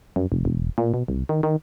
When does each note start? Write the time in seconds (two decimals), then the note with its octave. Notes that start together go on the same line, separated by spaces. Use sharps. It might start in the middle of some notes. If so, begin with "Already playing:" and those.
0.16 F#2
0.32 F1
0.45 E1
0.78 A#2
0.94 B2
1.08 C2
1.29 D#3
1.43 D#3